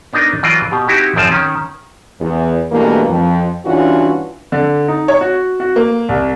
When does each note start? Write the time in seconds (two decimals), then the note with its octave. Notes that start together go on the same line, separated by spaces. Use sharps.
0.13 B3 D4 D#4 A#4 D#5
0.43 E3 F#3 F4 D5 D#5
0.71 B2 G4
0.88 C4 D#4 E4 F#4 G4
1.16 G#1 F#2 F3 C4 F4 A5
1.31 D#3 C#4
2.21 E2
2.72 G2 B2 E3 A3 A#3
3.10 F2
3.66 G2 E3 C#4 D4 F4 F#4
4.52 D3
4.88 D#4
5.08 C#5
5.21 F#4
5.60 F#4
5.76 A#3
6.09 C2